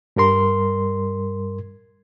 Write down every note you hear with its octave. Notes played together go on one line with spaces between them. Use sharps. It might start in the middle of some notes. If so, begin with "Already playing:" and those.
G2 G3 A#4 C6